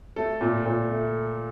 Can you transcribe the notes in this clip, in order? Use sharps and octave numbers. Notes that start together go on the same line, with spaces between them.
A3 A4
A#2
A#2
A3